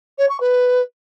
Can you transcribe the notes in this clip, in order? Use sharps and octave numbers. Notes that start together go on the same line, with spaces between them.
C#5
C#6
B4